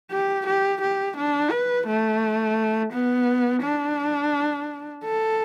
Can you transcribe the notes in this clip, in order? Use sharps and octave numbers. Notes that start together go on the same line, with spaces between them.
G4
G4
G4
D4
B4
A3
B3
D4
A4